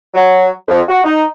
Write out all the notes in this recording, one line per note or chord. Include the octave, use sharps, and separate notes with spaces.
F#3
F2
F#4
D#4